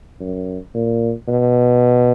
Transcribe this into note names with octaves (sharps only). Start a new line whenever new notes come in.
F#2
A#2
B2